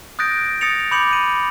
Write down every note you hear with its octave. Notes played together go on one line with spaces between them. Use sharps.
D#6 F#6 G6 A6 A#6 D7
D#6 A6 A#6 C#7 F7
B5 D6 G6 C#7 F7 F#7
D#7